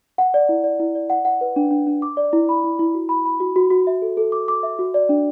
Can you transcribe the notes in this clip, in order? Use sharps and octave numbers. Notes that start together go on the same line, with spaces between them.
F#5
D5
E4
D5
E4
D5
F#5
F#5
B4
D4
D4
D4
D6
D5
E4
B5
E4
E4
F#4
B5
B5
F#4
F#4
F#4
E5
A4
A4
D6
D6
E5
F#4
D5
D4